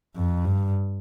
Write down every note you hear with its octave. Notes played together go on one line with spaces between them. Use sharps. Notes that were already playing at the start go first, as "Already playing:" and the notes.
F2
G2